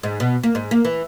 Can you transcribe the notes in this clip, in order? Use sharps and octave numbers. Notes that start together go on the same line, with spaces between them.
G#2
B2
A#3
G#2
A#3
E3